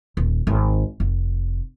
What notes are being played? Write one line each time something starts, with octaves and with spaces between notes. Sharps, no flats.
D#1
G#1
F1